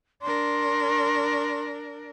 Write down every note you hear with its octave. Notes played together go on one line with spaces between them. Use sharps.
D4 A#4 C6